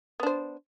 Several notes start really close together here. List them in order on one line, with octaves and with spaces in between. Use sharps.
B3 D4 C5